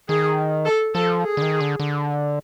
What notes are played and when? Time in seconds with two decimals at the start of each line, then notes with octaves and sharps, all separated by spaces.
0.08 D#3 G#4
0.65 A4
0.94 F3 A4
1.23 G#4
1.37 D3
1.42 D#3
1.61 D3
1.80 D3